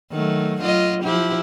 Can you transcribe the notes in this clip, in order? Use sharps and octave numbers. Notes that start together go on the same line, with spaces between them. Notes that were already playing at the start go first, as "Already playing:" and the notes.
D#3 F#3 A3
F#3 F4 D#5
F3 E4 G4